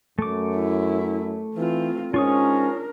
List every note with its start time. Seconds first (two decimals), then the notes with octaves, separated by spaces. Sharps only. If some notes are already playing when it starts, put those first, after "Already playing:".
0.19 F#2 A3 D6
0.56 E4
1.55 E3 C4 F4
2.14 G#2 C#4 D4 F4 A#4 C#6 D#6